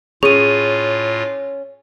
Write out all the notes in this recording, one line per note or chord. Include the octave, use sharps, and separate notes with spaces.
A2 C#4 F4 G#4 C#6 D#7